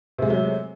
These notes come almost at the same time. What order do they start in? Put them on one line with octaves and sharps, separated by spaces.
C3 G#3 A3 F#3